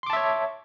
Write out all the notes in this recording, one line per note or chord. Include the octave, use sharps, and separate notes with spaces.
C#5 E5 A5 C6 D6